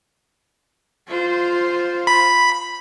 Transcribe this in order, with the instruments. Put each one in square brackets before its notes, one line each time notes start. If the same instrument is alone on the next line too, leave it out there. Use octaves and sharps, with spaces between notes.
[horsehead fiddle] F4 C5
[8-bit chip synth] B5